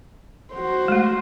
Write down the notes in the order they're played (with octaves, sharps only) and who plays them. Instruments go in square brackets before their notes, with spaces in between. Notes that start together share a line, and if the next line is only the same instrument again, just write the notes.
[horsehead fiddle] F#4 C5
[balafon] G#3 A3